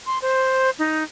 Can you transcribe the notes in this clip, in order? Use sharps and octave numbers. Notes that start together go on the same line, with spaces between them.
C6
C5
D#4